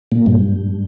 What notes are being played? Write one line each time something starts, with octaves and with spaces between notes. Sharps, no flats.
A#2
G2